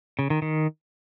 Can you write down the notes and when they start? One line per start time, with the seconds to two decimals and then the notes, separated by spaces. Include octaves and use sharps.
0.19 C#3
0.30 D#3
0.42 D#3